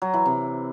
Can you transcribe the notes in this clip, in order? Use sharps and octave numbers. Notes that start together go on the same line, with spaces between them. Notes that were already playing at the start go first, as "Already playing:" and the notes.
F#3
E3
C3